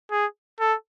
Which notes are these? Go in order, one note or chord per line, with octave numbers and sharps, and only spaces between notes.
G#4
A4